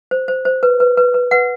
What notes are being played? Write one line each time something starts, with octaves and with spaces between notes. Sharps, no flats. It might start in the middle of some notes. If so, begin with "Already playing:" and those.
C5
C5
C5
B4
B4
B4
B4
B4 F#5